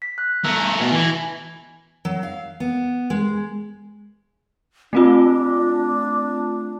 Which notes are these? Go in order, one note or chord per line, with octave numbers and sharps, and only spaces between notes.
B6
F#6
A3 A#4 E6
G#5
B2
E3 G#5 A#6
F#3
F5
B3
G#3
A3 C4 D4 F4